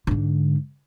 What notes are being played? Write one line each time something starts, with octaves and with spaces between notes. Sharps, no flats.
G#2 D3